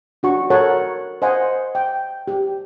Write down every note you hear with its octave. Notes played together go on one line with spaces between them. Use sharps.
D4 F#4 C#6
F#4 A4 A#4 C#5 F#5 A5
C5 D#5 F#5 G#5 C6
G5
G4